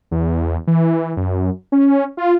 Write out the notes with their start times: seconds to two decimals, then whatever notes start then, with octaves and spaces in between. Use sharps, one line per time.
0.11 E2
0.67 E3
1.17 F#2
1.72 C#4
2.17 F4